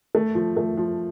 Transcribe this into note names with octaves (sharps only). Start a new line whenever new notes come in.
A3
F3
A3
F3